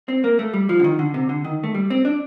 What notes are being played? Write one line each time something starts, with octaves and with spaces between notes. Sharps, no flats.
C4
A#3
A3
G3
F3
D3
D#3
D3
C3
D3
D#3
A3
G3
C4
D4